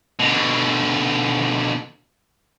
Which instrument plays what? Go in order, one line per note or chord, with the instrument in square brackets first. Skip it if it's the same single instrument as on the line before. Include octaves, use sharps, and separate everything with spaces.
[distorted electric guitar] B2 D3